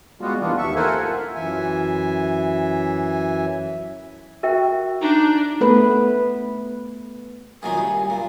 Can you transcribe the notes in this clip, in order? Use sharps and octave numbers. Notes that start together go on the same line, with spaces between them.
G3 G#3 B3 F4 F#4
E3 A#3 B3 D4 F4
D#2 E5 C#6
A4 A#4 C5 E5 F#5 G#5
F4
F#2 E3 E5 G#5
F#4 A#4 E5 G5
D4 D#4
A3 B3 B4
F#2 A#2 D#3 G#5
G2
A#2 F5